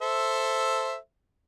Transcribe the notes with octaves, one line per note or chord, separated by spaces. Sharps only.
A4 C5 E5